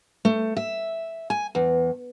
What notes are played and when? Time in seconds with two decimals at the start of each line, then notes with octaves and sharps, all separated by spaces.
0.25 A3
0.57 E5
1.30 G#5
1.55 E2